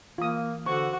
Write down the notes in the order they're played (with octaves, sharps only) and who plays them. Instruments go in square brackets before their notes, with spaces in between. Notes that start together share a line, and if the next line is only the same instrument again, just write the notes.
[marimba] E3 [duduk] A#3 [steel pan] F4 D#6
[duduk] D3 [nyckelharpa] F#4 F#5 [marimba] C5 [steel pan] C#6